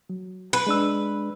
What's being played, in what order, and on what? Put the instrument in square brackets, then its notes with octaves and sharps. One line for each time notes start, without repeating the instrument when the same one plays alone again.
[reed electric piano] F#3
[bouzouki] B4
[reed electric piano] G#3 D4 E6